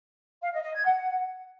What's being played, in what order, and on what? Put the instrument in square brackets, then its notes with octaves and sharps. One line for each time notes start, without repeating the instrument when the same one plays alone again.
[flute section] F5
D#5
D#5
G#6
F#5